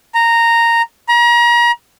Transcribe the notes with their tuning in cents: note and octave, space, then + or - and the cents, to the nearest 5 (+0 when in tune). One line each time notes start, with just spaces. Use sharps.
A#5 -10
A#5 +35